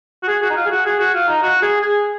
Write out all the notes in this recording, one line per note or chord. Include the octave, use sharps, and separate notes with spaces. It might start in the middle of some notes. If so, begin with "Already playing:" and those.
F#4
G#4
F#4
D#4
F4
G#4
F#4
G#4
F#4
F4
D#4
F#4
G#4
G#4